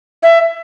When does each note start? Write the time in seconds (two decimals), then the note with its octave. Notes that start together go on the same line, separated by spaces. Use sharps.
0.23 E5